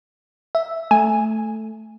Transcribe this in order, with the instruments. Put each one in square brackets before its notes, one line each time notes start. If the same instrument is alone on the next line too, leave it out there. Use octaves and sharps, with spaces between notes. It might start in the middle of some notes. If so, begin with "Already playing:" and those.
[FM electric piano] E5
[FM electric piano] A3 [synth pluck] G#5